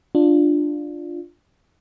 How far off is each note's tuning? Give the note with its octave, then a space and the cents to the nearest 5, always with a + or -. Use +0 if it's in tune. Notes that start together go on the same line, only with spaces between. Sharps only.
D4 +10 F4 +0